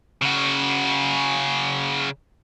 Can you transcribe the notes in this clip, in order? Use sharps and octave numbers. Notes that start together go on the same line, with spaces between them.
C#3 F#4